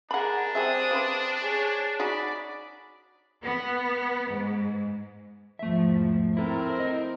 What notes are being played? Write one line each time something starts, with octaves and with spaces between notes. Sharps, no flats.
D4 G#4 A#4 F#5 B5
G3 C4 G#4 E5 D#6
C#3 B4 C5
G#4 C#5
D#4 F#4 G#4 D5 B5
B3
G#2
E2 G#2 F3 A3 E5
C4 E4 A4 A#4
E4 D#5